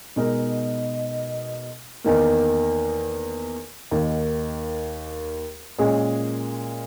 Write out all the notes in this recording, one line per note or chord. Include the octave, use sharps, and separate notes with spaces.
B2 G#3 D#4 A#4
E2 D#3 A#3
D#2 D#3 A#3
A#2 G#3 C#4 G#4